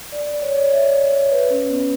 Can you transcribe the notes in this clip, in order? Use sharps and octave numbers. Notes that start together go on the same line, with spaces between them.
D5
D5
C#5
D5
E5
D5
D5
C#5
B4
C#4
B3